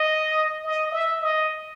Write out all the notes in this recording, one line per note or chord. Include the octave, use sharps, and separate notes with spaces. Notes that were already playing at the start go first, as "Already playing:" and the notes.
Already playing: D#5
D#5
E5
D#5